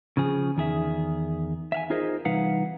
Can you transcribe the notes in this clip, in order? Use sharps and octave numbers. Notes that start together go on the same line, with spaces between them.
C#3 F3 G#4
E2 D#3 G#4 E5
E5 F5 G#5
D#4 F4 G#4 A#4 C5 D#5
C2 E3 D#4 B4 F5 F#5